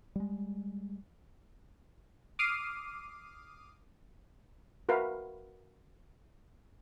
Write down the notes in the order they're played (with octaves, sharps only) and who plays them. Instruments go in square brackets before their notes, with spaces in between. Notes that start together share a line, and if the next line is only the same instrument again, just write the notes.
[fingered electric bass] G3 G#3
[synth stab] D6 D#6 F6 C7 D#7
[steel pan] F#4 A#4 B4 E5 F5